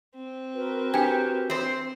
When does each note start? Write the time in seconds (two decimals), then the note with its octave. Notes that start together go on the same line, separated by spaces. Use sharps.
0.15 C4
0.54 F#4 A#4 B4
0.94 D4 G4 G5
1.50 C4 C5